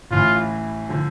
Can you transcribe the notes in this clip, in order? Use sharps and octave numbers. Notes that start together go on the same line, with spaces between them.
A1 A2 E3 F4
D3 F3